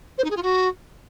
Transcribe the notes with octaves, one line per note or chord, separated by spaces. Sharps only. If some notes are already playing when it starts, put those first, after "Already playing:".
C5
D#4
G#4
F4
F#4